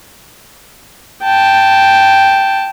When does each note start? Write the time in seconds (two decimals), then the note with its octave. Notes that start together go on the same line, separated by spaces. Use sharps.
1.23 G5 A5